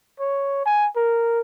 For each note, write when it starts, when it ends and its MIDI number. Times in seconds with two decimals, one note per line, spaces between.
0.20 0.62 73
0.66 0.87 80
0.96 1.40 70